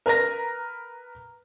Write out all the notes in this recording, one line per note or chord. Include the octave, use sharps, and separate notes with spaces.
A#4 B4 A#5 A#6